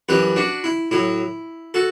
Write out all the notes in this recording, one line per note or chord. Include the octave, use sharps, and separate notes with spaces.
F#2 E3 G3 G4 B4
D4 F#4
E4
A2 F#3 E4
F#4 A4